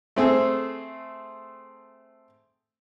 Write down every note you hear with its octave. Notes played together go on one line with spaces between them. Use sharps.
A3 C4 G#4 A4